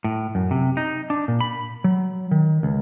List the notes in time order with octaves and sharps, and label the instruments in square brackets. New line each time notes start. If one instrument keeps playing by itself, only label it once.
[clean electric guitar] A2
F#2
C3
D#4
D4
A#2
B5
F#3
D#3
C#2